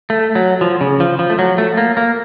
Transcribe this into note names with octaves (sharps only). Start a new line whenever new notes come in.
A3
F#3
F3
C#3
F3
F3
A3
F#3
A3
A#3
A#3